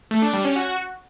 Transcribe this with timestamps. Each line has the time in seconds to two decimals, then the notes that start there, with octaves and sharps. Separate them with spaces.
0.11 A3
0.22 D4
0.33 G3
0.45 C#4
0.56 F#4